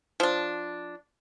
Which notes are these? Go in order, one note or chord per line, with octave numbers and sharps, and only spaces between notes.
F3 D4